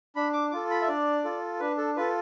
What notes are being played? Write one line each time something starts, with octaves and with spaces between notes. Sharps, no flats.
D4 B5
D6
F4 A4 D6
B5
E5
D4 D5
F4 A4
D4 B4
A4
F4 A4 B4